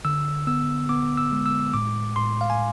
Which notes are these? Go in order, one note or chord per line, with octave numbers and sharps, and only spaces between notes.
D3 E6
B3 E6
B3 D6
E6
G#3
E6
A2 D6
A2 C6
F5
G#5